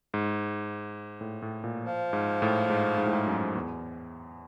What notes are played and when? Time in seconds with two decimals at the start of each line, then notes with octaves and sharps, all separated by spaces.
0.14 G#2
1.21 A2
1.42 A2
1.64 A#2
1.84 F3
2.13 G#2
2.42 A2
2.70 G#2
2.98 G#2
3.06 A2
3.13 G#2
3.27 F#2
3.55 E2